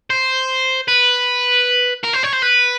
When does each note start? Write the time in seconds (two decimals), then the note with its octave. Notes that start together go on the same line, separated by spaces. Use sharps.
0.10 C5
0.88 B4
2.04 A#4
2.14 C5
2.24 C#5
2.33 C5
2.42 B4